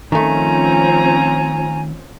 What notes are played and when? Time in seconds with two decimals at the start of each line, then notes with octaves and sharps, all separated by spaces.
0.12 D#3 F3 A3 C4 C#4 G#5 A#5